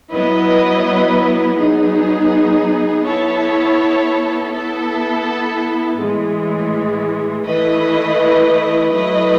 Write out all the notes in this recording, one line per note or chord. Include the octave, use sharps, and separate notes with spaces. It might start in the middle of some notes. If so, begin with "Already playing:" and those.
F#3 B3 E4 B4 D#5
F#3 B3 D#4 G#4
B3 E4 A4 C#5
B3 E4 A4
A2 E3 G#3
E3 A3 E4 B4 D#5
F#3 A3 E4 B4 D#5